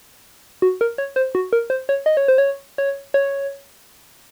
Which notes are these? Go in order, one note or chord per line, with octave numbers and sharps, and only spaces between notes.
F#4
A#4
C#5
C5
F#4
A#4
C5
C#5
D#5
C#5
C5
C#5
C#5
C#5